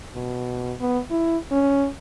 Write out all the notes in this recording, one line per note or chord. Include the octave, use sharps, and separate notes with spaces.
B2
B3
E4
C#4